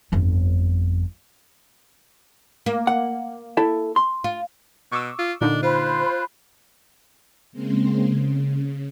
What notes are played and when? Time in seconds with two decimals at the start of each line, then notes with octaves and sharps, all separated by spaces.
0.12 G1 F2
2.66 A#3
2.87 F#5
3.57 E4 A4 E5
3.96 C6
4.24 F4
4.92 B2 C#6 D6 E6
5.19 F4
5.41 A#2 D3 D4 D#4
5.63 F4 C5 B5 F#6
7.52 C#3 G#3 A#3 C4 C6
8.08 C#3